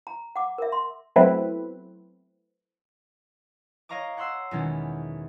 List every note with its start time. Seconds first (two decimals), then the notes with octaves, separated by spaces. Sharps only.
0.07 A#5
0.36 F#5 D6
0.58 A#4 E5
0.72 C6
1.16 F#3 A3 B3 C4 E4 B4
3.89 C#5 D#5 F5 A#5 C#6 D6
4.17 C#5 F#5 C6 E6 C7
4.51 E2 B2 D#3 G#3 A3 C#4